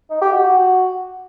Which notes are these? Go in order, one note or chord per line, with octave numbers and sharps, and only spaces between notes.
D#4
G4
F#4
F#4